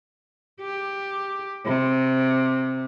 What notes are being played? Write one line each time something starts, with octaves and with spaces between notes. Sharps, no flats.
G4
C3